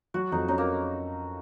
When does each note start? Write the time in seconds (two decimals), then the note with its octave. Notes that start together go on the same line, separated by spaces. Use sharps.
0.14 F#3 F#4
0.32 F2 D#4
0.48 C#4 D#4
0.58 A#3